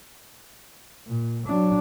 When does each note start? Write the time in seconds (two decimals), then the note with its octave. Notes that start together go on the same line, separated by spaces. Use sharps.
1.08 A#2
1.47 F#3 D4